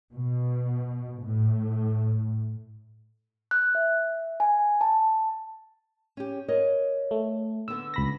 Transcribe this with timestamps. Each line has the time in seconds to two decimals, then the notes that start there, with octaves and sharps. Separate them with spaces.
0.13 B2
1.22 A2
3.51 F#6
3.75 E5
4.40 G#5
4.81 A5
6.17 C#4 G4
6.48 A#4 C#5 D#5
7.11 A3
7.68 D3 B3 E6
7.94 C#2 B5 A#6